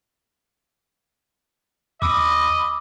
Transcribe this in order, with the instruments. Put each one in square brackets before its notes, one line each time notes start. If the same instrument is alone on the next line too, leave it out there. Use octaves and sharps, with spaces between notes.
[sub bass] D#2 [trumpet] D#5 [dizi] B5 [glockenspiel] D6 E6